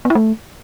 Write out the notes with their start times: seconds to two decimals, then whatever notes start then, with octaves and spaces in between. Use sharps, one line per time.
0.05 B3
0.10 E4
0.15 A3